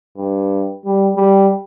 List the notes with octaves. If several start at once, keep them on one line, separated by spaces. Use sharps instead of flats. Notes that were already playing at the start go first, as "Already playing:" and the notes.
G2
G3
G3